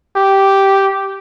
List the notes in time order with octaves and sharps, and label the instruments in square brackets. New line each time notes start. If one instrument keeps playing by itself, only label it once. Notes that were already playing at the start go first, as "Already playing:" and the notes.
[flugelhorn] G4